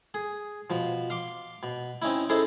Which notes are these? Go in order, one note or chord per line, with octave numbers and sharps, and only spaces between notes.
G#4
B2 F3
F5 C6 D6
B2
C4 C#4 D#4 E4
C#4 D#4 E4 G#4 A4 C5